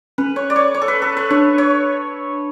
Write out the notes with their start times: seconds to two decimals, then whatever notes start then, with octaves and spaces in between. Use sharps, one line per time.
0.18 C#4 B4
0.36 C#5
0.50 D5
0.56 C#5
0.74 C#5
0.82 A4
0.88 B4
1.02 A4
1.17 B4
1.30 D4 C#5
1.58 C#5